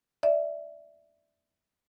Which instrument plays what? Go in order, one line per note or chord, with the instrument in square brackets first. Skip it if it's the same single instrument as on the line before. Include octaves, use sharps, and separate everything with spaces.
[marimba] D5 E5